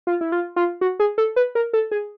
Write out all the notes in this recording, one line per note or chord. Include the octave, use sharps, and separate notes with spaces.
F4
E4
F4
F4
F#4
G#4
A4
B4
A#4
A4
G#4